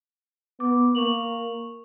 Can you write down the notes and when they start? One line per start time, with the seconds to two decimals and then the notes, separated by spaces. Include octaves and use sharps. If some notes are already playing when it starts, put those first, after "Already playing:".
0.60 B3 D6
0.95 A#3 C#6 F7 F#7